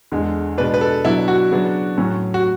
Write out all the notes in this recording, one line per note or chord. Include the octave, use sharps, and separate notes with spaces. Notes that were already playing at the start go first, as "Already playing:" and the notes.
E2 D3 G#3
B2 G#3 B3 D4 B4
B4
A4
B2 F#3 B3 D4 E4
F#4
C#3 F#3 B3 D4
A2 F#3 C#4
F#4